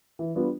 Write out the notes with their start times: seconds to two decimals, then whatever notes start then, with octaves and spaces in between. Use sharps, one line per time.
0.19 E3
0.35 G3 B3 D4 F4